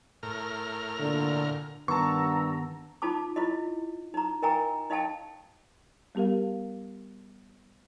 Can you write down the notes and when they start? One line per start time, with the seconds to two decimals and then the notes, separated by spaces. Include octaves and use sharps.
0.23 A2 A#4 F6
1.00 A#2 D3
1.88 G2 D#3 B3 F#5 A5 A#5 C#6 E6
3.02 D#4 F4 A5 D6
3.36 E4 F4 D#5
4.14 D#4 A#5
4.42 A#4 D#5 G5 G#5 A#5
4.90 D#4 D#5 F5 G5 A5
6.15 G3 B3 G4 A#4 F5